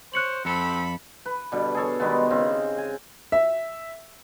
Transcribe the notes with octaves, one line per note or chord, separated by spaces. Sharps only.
C5 C#5 F#6 C#7 F#7
F2 C4 A4 B5
B4
B2 D3 G3
G#4 A4 C#5
D#3 G3 G#3 B3
C#3 C4
G#5
E5